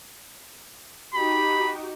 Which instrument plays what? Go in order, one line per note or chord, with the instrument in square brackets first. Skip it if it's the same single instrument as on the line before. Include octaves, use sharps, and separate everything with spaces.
[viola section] D#4 F#4 G4 [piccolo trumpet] B5